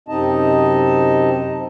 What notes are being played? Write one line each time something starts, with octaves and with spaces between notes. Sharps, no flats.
F#2 C3 C4 D#4 D#5 A5